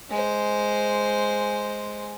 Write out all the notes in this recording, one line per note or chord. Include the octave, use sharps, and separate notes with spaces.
G#3 C5